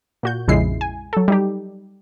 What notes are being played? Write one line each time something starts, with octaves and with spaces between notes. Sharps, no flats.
A#2 F#4 G6
A#1 F2 C#3 G#3 E4 C7
G#5
F#3 A4
G3 D#4 G4